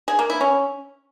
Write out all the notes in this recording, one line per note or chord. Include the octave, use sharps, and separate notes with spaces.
G#4
A#3
E4
C#4